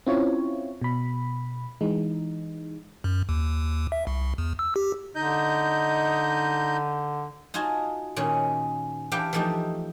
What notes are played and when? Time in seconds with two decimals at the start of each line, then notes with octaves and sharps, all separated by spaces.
0.06 C4 C#4 E4 F4 C#5
0.82 B2 B5
1.81 E3 G#3 D#4
3.04 F#2
3.29 D#2
3.92 E5
4.07 C2
4.38 E2
4.59 E6
4.76 G4
5.15 D3 D#4 D#5 G6
7.54 D#4 F4 F#4 G#5 A5
8.16 A#2 D#3 C#4
9.12 E3 D4 G4 B4 F5 G5
9.33 E3 F3 A3 D#4 G4